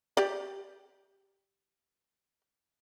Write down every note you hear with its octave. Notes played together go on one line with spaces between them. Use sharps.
G4 D5